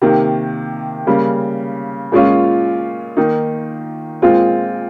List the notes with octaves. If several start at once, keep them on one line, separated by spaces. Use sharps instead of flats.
C3 D#3 A#3
C#3 G3 A#3
A#2 G#3 C#4 F4
D#3 A#3 D#4
A#2 G#3 C4 F4